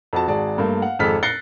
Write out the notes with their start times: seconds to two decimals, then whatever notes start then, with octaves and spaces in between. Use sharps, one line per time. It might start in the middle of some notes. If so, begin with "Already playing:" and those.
0.13 F2 F#4 A5
0.28 G#1 F#4 G#4 D5 A5
0.58 G2 A3 A#3
0.82 F5 F#5
0.99 G#1 F2 G#4 A4 F6 B6
1.23 F#6 A6 A#6 C7 C#7 G7